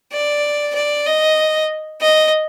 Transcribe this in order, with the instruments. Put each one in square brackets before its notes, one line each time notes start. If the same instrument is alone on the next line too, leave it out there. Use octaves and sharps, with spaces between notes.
[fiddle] D5
D5
D#5
D#5